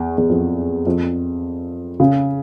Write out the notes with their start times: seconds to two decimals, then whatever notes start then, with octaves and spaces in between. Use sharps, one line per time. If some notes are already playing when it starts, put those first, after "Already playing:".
Already playing: E2
0.18 E2
0.29 F2
0.87 F2
2.00 C#3